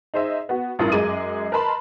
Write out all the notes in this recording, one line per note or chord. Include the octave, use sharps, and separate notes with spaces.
D#4 G#4 C5 D#5 E5
B3 F#4
A1 G2 E4 F4 A#4 D#6
F#2 G#3 G#4 D6 D#7
A#4 B4 D#5 A5 B5 C6